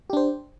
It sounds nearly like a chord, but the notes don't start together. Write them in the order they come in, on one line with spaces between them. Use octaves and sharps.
G4 D4 C5